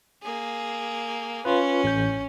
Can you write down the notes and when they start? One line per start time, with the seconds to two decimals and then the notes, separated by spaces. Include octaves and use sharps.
0.22 A#3 G#4
1.45 C#4 F4 B4
1.84 A1 G6